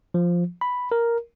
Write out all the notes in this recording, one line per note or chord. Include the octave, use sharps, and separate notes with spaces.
F3
B5
A#4